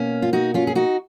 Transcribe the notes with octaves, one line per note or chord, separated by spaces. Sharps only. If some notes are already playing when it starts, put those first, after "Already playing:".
Already playing: B2 A#3 C#4
F4
D#4 F#4
C#4 F4
G#4
D#4 F#4